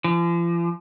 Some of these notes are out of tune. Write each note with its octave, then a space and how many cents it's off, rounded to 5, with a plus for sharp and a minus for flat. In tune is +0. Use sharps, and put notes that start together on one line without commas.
F3 -40